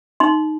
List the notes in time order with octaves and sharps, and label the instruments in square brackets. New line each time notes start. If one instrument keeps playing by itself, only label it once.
[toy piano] D#4 C6